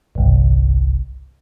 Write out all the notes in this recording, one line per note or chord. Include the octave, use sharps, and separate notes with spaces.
G1 C2